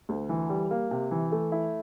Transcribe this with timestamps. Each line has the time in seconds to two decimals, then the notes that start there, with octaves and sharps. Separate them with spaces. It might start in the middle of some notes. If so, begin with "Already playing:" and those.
0.09 D2
0.29 E3
0.49 G3
0.71 A#3
0.91 C3
1.11 E3
1.32 A3
1.52 E4